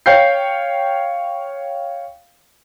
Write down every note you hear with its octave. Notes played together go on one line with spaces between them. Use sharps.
C#5 F5 G5 G6 C7